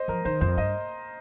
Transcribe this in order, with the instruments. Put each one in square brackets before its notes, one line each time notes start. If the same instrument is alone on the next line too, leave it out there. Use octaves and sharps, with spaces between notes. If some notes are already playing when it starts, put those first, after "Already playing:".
Already playing: [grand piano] C5 D#5
[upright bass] F3 [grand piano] A#4
[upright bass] D#3 [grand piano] C5
[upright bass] F2 [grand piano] C5
[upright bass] G2 [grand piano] D#5